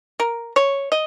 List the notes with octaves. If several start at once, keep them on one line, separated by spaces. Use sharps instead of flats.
A#4
C#5
D#5